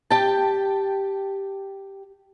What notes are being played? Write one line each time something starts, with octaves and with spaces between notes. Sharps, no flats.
G4 G5 A5